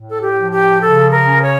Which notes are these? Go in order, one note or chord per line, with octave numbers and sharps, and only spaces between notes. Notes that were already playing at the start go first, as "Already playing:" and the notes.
Already playing: A2
A4
G4
F3
G4
C#3 A4
A#4
C#4
C#5